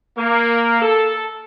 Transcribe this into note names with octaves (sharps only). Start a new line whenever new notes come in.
A#3
A4